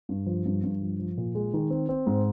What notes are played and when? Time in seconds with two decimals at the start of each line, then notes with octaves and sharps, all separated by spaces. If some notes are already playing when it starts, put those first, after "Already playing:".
0.09 G2
0.26 F3
0.46 G2
0.63 G2
0.82 F3
0.99 F3
1.17 A#2
1.35 G#3
1.54 D#3
1.70 C4
1.89 C4
2.07 G#2